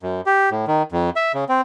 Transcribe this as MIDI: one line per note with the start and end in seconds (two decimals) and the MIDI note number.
0.03 0.21 42
0.26 0.50 67
0.51 0.65 45
0.67 0.83 51
0.92 1.10 41
1.16 1.32 76
1.34 1.44 49
1.49 1.61 60